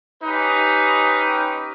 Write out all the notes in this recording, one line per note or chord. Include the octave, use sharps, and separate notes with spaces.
C#4 D#4 G4 B4